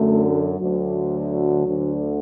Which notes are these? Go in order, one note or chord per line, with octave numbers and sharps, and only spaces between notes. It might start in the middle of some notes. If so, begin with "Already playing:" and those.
Already playing: F#2 D3 A3
D2 D3 F#3
D2 D3